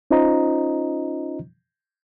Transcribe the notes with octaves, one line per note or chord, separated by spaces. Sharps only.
C#4 D#4 F4 C5 D#5 A#5